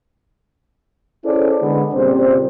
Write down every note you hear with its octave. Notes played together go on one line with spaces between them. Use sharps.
C#4 E4 G#4 A4 C5 D5
D3 G#3 B3
A#2 C#3 G3 C4 C5